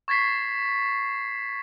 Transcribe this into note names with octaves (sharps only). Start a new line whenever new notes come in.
C#6 G#6 A6 B6 C7